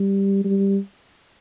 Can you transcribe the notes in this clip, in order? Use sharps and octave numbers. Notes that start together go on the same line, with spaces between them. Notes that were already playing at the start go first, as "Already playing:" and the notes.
Already playing: G3
G3